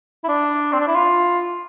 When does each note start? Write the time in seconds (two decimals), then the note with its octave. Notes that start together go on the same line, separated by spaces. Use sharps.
0.24 E4
0.29 D4
0.73 C4
0.80 D4
0.88 E4
0.95 F4